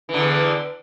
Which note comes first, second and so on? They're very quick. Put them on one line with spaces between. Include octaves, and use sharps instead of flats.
E3 D3 E2